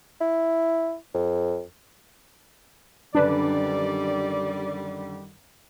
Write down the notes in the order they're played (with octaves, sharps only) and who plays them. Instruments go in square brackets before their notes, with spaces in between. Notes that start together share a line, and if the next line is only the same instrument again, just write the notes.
[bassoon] E4
F2
[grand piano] F#2 D3 [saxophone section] D#3 G3 [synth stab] D4 B4 [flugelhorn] D5